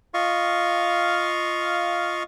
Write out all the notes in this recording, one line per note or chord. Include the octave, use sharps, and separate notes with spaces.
F4 D#5 F5 C#6